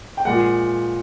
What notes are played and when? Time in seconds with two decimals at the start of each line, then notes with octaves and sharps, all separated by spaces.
0.17 G5
0.25 A#2 F3 G#3 F#5